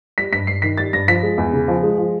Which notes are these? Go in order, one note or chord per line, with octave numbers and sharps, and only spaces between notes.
G3 B6
G2 B6
G2 C7
D#3 B6
G3 A6
G2 A#6
F3 B6
G#3
E2
C#3
F3
G#3
F3